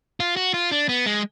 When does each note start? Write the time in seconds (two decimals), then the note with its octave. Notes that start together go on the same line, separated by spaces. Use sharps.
0.20 F4
0.36 F#4
0.54 F4
0.72 D4
0.89 B3
1.06 G#3